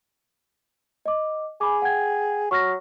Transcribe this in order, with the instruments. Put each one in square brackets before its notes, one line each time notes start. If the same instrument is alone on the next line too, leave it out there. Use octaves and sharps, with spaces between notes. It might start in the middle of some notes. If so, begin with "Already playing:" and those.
[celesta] D#5 D6
[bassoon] G#4 [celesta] G#5 B5 D6
[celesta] F#5 G5 G#6
[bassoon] F#3 [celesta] C#6 F6 A#6